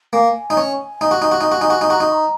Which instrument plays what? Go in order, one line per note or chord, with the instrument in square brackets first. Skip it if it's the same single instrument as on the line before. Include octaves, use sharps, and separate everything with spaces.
[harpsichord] A#3 [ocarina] G#5
[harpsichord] D#4
C#4
D#4
F#4
D#4
F#4
D#4
F#4
D#4
F#4
D#4
[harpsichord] F#4 [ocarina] A#5
[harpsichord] D#4 [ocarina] C#6
[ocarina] A#5